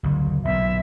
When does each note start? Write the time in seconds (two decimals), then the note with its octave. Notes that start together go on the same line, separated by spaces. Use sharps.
0.03 F#1 D2
0.45 B1 A#2 E5